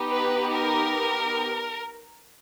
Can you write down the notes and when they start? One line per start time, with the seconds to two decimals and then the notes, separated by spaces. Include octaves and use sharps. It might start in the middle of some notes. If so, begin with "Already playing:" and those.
Already playing: B3 D#4 G4
0.10 B4
0.55 A#4